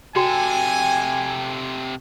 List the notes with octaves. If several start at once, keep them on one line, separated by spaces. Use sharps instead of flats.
C3 F#4 A4 G5 G#5